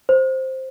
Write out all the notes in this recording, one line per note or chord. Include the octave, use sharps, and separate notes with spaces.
C5